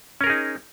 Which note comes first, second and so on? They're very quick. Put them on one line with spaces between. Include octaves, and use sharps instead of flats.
C#4 A#4 G#4 D#4